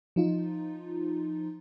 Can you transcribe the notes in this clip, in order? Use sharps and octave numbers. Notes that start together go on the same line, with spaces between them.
F3 D#4 F4